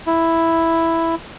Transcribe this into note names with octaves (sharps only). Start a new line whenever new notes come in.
E4